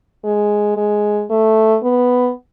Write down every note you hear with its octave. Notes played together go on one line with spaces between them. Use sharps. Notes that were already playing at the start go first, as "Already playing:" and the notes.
G#3
G#3
A3
B3